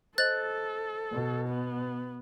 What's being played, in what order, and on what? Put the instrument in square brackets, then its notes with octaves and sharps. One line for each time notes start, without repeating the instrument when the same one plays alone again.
[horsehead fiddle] A4 [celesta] C5 D#5 F#7 [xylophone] F#6 A6
[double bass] B2
[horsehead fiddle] B3